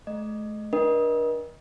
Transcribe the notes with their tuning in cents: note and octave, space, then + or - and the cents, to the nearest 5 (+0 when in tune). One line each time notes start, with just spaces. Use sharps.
A3 -40 D#5 -15
D4 +0 A#4 +45 D#5 +20